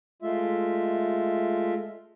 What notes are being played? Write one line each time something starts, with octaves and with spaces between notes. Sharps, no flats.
G#3 A3 F4 E5